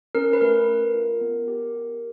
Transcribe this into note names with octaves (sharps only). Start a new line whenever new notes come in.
C#4 A#4
B4
A3 A#4
C#4
F4
B3
G4
G4